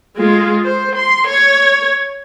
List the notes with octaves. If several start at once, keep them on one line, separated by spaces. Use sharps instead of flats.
G#3 F4
C5
C6
C#5